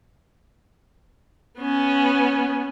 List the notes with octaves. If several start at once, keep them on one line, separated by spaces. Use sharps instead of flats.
B3 C#4